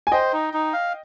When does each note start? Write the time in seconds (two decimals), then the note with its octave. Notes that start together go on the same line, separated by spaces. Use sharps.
0.07 G#5
0.12 C5 D#5 G5
0.33 D#4
0.54 D#4
0.73 F5